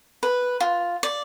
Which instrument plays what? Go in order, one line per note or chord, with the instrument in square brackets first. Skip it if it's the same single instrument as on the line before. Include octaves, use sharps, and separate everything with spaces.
[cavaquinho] B4
F4
D5